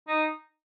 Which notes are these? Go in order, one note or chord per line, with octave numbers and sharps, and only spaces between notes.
D#4